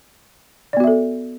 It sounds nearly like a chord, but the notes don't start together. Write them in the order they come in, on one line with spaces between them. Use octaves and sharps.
D5 B3 F#4 E5 A4